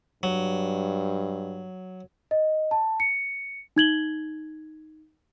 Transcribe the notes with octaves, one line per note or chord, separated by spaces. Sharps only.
G2 F#3
D#5
A5
C#7
D#4 G#6 F#7 G7